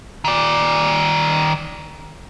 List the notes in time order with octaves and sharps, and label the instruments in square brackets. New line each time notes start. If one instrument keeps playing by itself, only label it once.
[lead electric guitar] D#3 D5